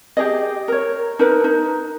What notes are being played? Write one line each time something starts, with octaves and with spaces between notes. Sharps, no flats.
G4 G#4 D#5
A#4 C#5
D#4 A#4 B4
D#4